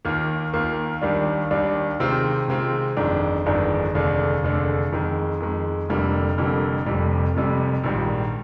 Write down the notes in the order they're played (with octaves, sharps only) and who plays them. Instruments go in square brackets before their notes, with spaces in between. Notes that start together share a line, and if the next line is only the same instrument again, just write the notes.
[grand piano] D#2 D#3 A#3 F4
D#2 D#3 A#3 F4
D#2 D#3 G3 D4
D#2 D#3 G3 D4
C3 D#3 G#3 C4 F4
C3 D#3 G#3 C4 F4
G1 F2 D#3 G#3 D4
G1 F2 D#3 G#3 D4
F1 D#2 D3 G#3 D4
F1 D#2 D3 G#3 D4
F2 D#3 G#3
F2 D#3 G#3
F1 F2 D3 G3 A#3
F1 F2 D3 G3 A#3
F1 F2 C3 G3
F1 F2 C3 G3
A#1 G#2 D#3 G3